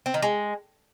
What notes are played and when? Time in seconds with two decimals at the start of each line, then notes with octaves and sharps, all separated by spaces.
0.06 C4
0.14 D#3
0.22 G#3